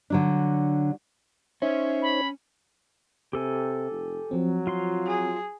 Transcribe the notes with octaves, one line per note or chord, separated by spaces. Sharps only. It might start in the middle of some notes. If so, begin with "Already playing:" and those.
D3 F#3 D4
C#4 D#4 C5 C#5 E5
B5
C3 G4 A4 G#5
F1
F3 F#3 C4
F4 F5 C6
G#4